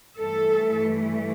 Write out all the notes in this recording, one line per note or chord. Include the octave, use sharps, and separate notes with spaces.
G2 E3 A3 A4